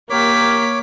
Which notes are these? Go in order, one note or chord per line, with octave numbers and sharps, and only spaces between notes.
A#3 G4 A#4 C#5 D6 B6